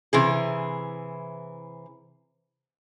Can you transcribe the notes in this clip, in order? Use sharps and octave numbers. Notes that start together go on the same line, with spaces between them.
C3 E3 G#4